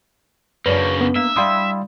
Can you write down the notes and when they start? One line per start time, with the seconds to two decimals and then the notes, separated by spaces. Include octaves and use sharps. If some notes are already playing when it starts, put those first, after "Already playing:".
0.66 F#2 C#3 A#3 C#4 D4 B4
1.01 B3
1.16 A#3 E5
1.36 G3 E4 F5 C6 D#6